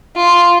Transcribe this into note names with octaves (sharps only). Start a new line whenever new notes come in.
F4